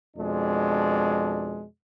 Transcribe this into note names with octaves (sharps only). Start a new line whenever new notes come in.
F2 B2 G#3 D4